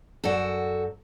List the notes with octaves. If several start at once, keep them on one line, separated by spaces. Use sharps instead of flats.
F#2 F#4 A4 D5